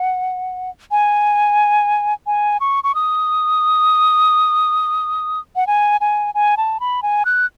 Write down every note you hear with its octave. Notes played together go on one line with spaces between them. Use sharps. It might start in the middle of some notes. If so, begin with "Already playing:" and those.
Already playing: F#5
G#5
G#5
C#6
C#6
D#6
F#5
G#5
G#5
G#5
A5
B5
G#5
F#6